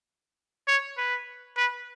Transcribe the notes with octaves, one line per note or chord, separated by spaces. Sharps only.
C#5
B4
B4